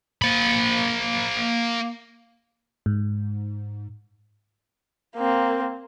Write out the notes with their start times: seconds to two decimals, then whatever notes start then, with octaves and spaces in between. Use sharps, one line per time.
0.22 A#3 B5
2.86 G#2
5.17 A#3 C4